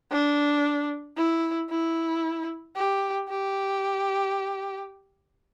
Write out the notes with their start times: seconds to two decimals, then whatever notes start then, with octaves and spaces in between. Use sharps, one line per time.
0.11 D4
1.17 E4
1.70 E4
2.76 G4
3.29 G4